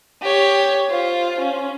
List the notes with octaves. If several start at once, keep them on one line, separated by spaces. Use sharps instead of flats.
G4 C#5
F4 C5
C#4